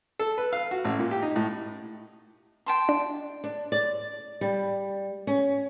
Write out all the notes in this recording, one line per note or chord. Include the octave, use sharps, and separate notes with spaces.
A4
B4
F5
F#4
A1
A#2
G4
D#4
A2
G5 A5 C6
D4
D4
D5
G3
C#4